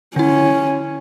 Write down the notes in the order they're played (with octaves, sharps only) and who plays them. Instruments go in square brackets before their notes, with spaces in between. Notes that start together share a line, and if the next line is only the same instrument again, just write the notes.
[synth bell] D3 E4 [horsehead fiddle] C#4